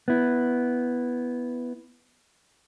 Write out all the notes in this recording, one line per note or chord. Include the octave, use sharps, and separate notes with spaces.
B3 E4